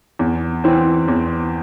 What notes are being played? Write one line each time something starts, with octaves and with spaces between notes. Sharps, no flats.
E2
E3 C4
E2